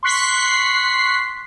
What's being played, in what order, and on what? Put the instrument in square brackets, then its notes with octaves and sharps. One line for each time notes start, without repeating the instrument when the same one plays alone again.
[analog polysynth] C6 C#6 F#6 B6 C7